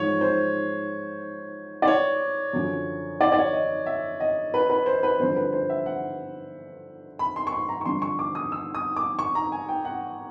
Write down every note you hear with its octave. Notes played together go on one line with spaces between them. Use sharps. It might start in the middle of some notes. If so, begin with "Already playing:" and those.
Already playing: G#2 F3 C#5
C5
D5
C#5
F#2 D3 F3
D5
D5
C#5
D#5
E5
D#5
B4
B4
C5
B4
G2 D3 F3 C5
B4
C5
E5
F#5
B5
C6
C#6
C6
A#5
C#6
G2 D3 F3 C6
C#6
D6
D#6
E6
D#6
D6
C#6
A#5
G#5
G5
F#5